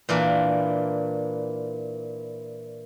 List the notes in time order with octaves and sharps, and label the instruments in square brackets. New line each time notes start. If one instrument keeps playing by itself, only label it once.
[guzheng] A#2 E3 A#3 D4